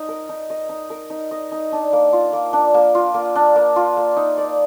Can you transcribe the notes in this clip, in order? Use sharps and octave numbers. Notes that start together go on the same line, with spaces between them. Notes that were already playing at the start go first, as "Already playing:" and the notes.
Already playing: D#4 D#5
A#4
D#4
D#5
D#4
A#4
D#4
D#5
D#4
D4
A#3
F4
A#3
D4
A#3
F4
A#3
D4
A#3
F4
A#3
D#4
D5